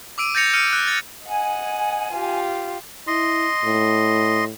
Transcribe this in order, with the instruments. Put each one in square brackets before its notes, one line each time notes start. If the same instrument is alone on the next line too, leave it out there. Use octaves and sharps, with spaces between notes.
[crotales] D6 E6 D7 D#7
G6 A6 A#6 C#7 F7
F6 C#7 D#7
F#6
A6
[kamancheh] D#5 F#5 [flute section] G#5
[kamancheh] F4 G4
[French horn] E4 [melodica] D#5 C6
[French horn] A2